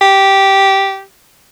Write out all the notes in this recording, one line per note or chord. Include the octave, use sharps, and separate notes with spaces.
G4